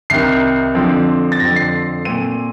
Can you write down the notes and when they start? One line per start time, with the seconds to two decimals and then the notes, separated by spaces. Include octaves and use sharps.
0.10 C2 C3 D#3 C7
0.75 F2 D3 F3 C4
1.32 A6
1.40 F2 D3 F3 C4 A#6
1.56 C7
2.05 A#2 A3 C4 D#7